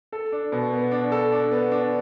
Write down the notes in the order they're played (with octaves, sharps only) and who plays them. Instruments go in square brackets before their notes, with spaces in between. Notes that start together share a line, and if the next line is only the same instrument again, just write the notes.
[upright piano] A4
D4
B2
B3
D4
A4
D4
B3
D4